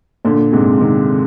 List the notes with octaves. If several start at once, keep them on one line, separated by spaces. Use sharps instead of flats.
A#2 D3
G#2 C3
C3 D#3